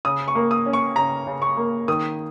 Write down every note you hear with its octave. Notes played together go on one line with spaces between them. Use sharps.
C#3 D#6
C#6
A#3
D#6
C#4
C#6
C#3 A#5
C#3
C#6
A#3
D#3 D#6